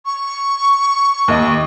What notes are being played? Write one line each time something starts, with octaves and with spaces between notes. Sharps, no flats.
C#6
D#2 D#5 D6